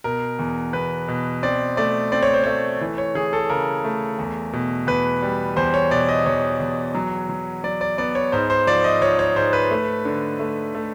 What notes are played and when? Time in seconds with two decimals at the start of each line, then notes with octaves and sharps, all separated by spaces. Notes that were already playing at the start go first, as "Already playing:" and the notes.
0.04 B2 A#4
0.39 E2
0.73 E2 B4
1.08 B2
1.43 C4 D5
1.77 A3 D5
2.12 C4 D5
2.23 C#5
2.34 C5
2.44 A3 C#5
2.81 E3
2.98 C#5
3.15 E3 G#4
3.33 A4
3.50 C#3 A#4
3.85 A3
4.19 E2
4.53 B2
4.87 E2 B4
5.22 G3
5.56 E2 C5
5.74 C#5
5.91 B2 D5
6.09 D#5
6.26 E2 C#5
6.60 E2
6.95 F#3
7.29 F#3
7.64 F#3 D5
7.81 D5
7.98 B3 D5
8.15 C#5
8.32 G#2 C5
8.50 C5
8.67 F3 D5
8.84 D#5
9.01 F3 C#5
9.19 C#5
9.36 G#2 C5
9.53 B4
9.71 A3
10.05 D3
10.39 A3
10.75 A3